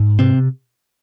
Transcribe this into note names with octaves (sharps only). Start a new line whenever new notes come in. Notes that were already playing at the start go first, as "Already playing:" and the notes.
Already playing: G#2
C3 C4